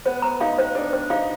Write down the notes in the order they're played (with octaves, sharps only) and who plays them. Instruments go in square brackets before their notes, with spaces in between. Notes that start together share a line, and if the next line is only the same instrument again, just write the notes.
[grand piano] B3 [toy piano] C5
[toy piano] A#5
[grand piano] D#4 [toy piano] F5
[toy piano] C5
[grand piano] D4 [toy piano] C5
[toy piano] C5
[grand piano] D#4 [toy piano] F5